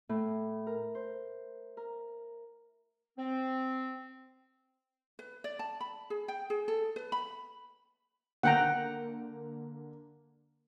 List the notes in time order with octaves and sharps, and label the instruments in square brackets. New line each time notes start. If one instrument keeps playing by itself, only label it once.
[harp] A2
A#4
C5
A#4
[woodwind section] C4
[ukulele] B4
D5
A5
B5
G#4
G5
G#4
A4
B4
B5
[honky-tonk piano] D3 A#3 [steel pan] F#5 G5 A#5